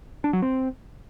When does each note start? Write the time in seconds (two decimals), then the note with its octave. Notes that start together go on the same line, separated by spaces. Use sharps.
0.24 D4
0.33 F#3
0.42 C4